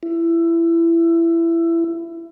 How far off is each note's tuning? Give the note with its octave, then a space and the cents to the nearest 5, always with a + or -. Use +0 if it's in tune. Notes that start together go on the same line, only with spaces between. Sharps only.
E4 +20